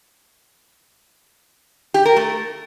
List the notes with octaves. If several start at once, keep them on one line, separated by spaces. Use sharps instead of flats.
G4
A#4
A3